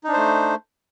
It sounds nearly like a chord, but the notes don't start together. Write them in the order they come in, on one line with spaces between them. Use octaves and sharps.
D#4 D4 C5 A3